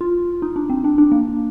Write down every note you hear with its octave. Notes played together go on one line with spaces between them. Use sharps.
F4
D#4
D4
C4
D4
D4
A#3